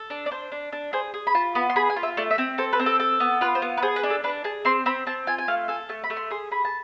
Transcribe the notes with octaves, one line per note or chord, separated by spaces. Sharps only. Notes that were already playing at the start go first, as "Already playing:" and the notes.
Already playing: A4
D4
D5
D4 C5
D4
D4
G#4 C5
G#4
B5
F4 A5
B3 B5
C6
G#4 B5
G#5
F4
E5
A3 D5
E5
C4
A4 C5
B4
C4
A4
A4
B3
F4 B4
C5
B3
B4
G#4 C5
B4
D4
A4
D4 B4
G#4 A5
C4 C6
C4 B5
C4 A5
F4 G#5
G#5
A3 F5
A4 G#5
A3 A5
B5
A3
C6
G#4 C6
G#4 B5
A5